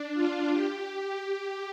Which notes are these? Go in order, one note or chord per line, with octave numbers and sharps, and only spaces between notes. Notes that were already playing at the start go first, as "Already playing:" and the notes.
Already playing: D4
F4
G4